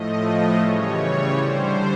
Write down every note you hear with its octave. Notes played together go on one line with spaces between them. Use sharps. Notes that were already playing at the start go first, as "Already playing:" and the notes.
Already playing: A2 F3 A3 D#5
D#5
C#3 E3 G3 C#5
D3 G3 C5